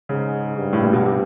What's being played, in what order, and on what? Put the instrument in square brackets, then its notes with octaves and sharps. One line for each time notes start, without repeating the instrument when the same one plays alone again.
[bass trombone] G#2 [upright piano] C#3
[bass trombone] G2
[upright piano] A2
A#2
B2
C3